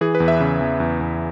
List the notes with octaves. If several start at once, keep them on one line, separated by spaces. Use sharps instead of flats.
E3 G#4
B4
E2
E5
C#3
E2
E2
E2